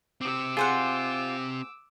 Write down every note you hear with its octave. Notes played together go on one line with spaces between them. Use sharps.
C4 G4 D6 E6
F4 G#4 C5 F#5